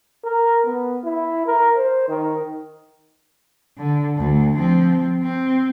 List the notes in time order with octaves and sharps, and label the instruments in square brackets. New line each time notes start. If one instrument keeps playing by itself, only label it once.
[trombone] A#4
B3
E4
A#4
C5
D#3
[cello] D3
D2
F3 C4
C4